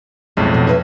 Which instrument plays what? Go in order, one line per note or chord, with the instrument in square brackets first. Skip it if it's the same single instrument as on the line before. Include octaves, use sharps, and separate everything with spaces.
[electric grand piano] B1 F2 A2 [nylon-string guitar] G#3
[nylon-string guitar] B2
E4 B4 C#5